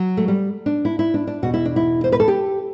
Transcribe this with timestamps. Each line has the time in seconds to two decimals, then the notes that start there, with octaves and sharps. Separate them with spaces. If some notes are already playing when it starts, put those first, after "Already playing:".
Already playing: F#3
0.17 A3
0.28 G3
0.66 D4
0.85 E4
0.99 E4
1.14 D4
1.27 D4
1.42 E2 B2 F#4
1.54 E4
1.65 D4
1.76 E4
2.04 C5
2.12 B4
2.20 A4
2.28 G4